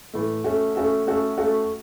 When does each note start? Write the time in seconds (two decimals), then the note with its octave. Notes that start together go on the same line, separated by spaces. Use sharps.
0.14 A2 E3 A3
0.44 A3 C#4 F#4 A4 E5
0.75 A3 C#4 F#4 A4 E5
1.06 A3 C#4 F#4 A4 E5
1.37 A3 C#4 F#4 A4 E5